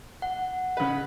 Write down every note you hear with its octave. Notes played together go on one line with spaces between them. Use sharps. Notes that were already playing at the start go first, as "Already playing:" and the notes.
F#5
C#3 B4